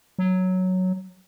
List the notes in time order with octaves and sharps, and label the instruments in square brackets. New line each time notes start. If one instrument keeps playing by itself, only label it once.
[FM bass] F#3